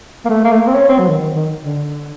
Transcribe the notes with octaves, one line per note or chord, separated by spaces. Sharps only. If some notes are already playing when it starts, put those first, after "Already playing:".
A#3
A3
A#3
A3
A#3
C4
C#4
C4
F#3
D#3
D#3
D#3
D3